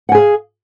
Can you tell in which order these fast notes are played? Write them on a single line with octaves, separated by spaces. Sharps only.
F#5 G#5 G#4 F5